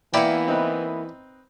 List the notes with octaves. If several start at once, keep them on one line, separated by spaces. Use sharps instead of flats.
E3 A#3 B3 E4 D5 G5
C4 D#4 B4